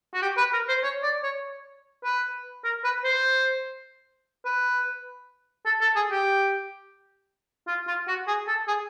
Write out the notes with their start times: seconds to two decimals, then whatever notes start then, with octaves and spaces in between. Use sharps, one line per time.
0.14 F#4
0.22 G4
0.38 B4
0.53 A#4
0.68 C5
0.83 C#5
1.03 D5
1.23 C#5
2.04 B4
2.64 A#4
2.84 B4
3.05 C5
4.45 B4
5.66 A4
5.81 A4
5.96 G#4
6.11 G4
7.67 F4
7.87 F4
8.08 F#4
8.28 G#4
8.48 A4
8.68 G#4